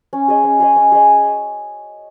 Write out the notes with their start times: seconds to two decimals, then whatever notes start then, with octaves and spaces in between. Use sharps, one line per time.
0.13 C#4
0.28 G#4 D#5
0.44 C#4
0.60 G#4 D#5
0.76 C#4
0.92 G#4 D#5